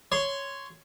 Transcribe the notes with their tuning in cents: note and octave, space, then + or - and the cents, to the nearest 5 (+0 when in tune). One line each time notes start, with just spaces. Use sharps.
C#5 +0 C6 -10